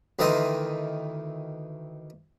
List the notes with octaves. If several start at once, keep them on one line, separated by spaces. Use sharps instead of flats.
D2 D#3 E3 A3 D#5 C6